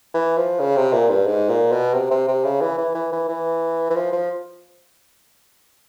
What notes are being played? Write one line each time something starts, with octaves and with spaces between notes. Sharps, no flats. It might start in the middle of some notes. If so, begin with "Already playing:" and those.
E3
F3
C#3
C3
A#2
G2
G#2
A#2
B2
C3
C3
C3
C#3
E3
E3
E3
E3
E3
E3
F3
F3